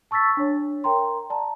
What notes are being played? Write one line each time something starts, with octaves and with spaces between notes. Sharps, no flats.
A5 C#6 E6 A6 B6
D4 C#5
A#4 G5 A#5 C6
D5 A5 A#5